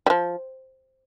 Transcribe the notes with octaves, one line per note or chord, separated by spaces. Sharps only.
G3
F3